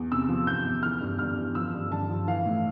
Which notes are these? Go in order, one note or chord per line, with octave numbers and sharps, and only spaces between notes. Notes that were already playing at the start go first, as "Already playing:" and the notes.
Already playing: E2
C3 E6
F3
E2 G6
E2
E3 F6
G2
G2 F6
E3
F3 E6
G2
G2 A5
F3
E3 F5
A2